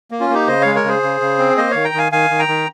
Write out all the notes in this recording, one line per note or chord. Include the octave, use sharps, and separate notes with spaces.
A#3
C#4 F4
A#3 D#4 G4
C#3 C5 D#5
G#3 C#5 F5
A#4 C#5
C#3 G#4 C5
C#3
C#3
C4
A#3 C5 D#5
D#3 C#5 F5
G5 A#5
D#3 F5 G#5
D#3 F5 G#5
D#3
G5 A#5
D#3